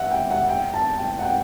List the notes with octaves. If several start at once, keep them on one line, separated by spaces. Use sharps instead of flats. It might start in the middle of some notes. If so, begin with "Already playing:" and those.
Already playing: E5 F#5
G5
F#5
G5
A5
G5
F#5
G5